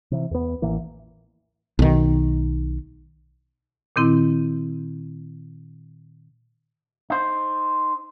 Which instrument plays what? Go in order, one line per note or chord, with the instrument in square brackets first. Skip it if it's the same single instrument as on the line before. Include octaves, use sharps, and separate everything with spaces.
[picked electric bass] C3 E3
E2 B3
A1 E3 A#3
[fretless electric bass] B1 D#3
[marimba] A#2 D#3 C4 E4
[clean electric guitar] D#4 C5